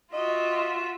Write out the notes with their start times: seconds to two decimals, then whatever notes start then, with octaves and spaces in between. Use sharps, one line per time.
0.13 F4 F#4 D#5 E5